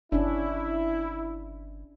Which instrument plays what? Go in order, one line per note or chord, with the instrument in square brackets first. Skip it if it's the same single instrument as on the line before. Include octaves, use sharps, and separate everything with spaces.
[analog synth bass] G1 [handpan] C#4 D4 [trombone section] E4